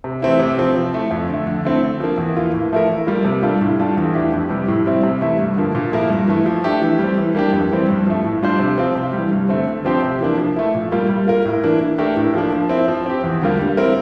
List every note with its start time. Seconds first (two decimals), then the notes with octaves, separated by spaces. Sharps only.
0.04 C3
0.22 E3 A3 C4 E4
0.40 C3
0.58 F3 C4
0.76 F3
0.94 A3 E4
1.11 F2
1.29 D3 A3
1.47 D3
1.65 A3 C4 E4
1.83 D3
2.00 F3 A#3
2.18 E2
2.37 E3 A#3 F4
2.54 A2
2.72 F3 A3 E4 A#4
2.89 E3
3.07 G3 A#3 F4
3.25 C3
3.43 G3 D4 F4 A4
3.61 A2
3.79 G3 D4 F4 A4
3.97 E2
4.14 E3 A3 D4 G4
4.32 F2
4.50 C3 G3
4.68 A2
4.86 G3 C4 E4
5.03 C3
5.21 E3 A3 E4
5.39 G2
5.56 D3 F3 A#3
5.75 A#2
5.92 F3 A#3 E4 A#4
6.10 G2
6.28 E3 A3 E4
6.46 F3
6.64 A3 D4 G4
6.82 E3
6.99 G3 C4
7.17 E3
7.35 G3 A#3 D4 G4
7.53 F2
7.71 E3 G3 C4
7.89 G2
8.07 F3 A3
8.24 A2
8.42 G3 D4 F4 C5
8.59 C3
8.78 F3 C4 F4
8.95 C3
9.13 E3 G3
9.32 G2
9.49 D3 A3 C4
9.68 D3
9.85 F3 C4 G4 C5
10.03 C3
10.20 E3 A#3 D4
10.38 F3
10.56 A3 E4
10.75 A#2
10.92 G3 A#3 F4
11.09 G3
11.27 A#3 F4 A#4
11.45 A2
11.64 E3 A#3 D4
11.81 E3
11.98 A3 D4 G4 A#4
12.16 A2
12.34 F3 A#3 D4
12.53 F3
12.69 C4 E4
12.88 F3
13.06 C4 G4
13.24 E2
13.41 D3 G3 A#3 F4
13.59 G3
13.77 C4 E4 A#4